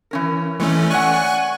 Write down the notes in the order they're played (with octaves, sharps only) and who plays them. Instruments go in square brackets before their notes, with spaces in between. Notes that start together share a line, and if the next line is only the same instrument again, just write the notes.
[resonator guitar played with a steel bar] E3 C#4 A#4
[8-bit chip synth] E3 A3 C#4 [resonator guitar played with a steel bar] G#3 A4
[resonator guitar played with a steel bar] D5 F#5 [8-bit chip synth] G#5 C#6 F#6